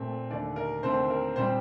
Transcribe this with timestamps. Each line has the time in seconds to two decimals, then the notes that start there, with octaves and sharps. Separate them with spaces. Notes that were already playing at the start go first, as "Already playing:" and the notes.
Already playing: A#2 A3 C4
0.30 D#2 D3 A3 D5
0.56 A#4
0.83 D#2 D3 A3 C4 C5
1.10 A#4
1.36 A#2 G3 C4 C5